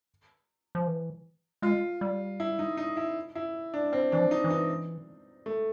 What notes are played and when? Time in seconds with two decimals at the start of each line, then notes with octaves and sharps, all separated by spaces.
0.75 F3
0.87 E3
1.62 G#3 F4
2.01 G3
2.40 E4
2.59 D#4
2.77 D#4
2.97 E4
3.35 E4
3.74 D4
3.93 C4
4.12 E3 D4
4.19 F3
4.31 D#4
4.44 E3
4.50 D#4
5.46 A3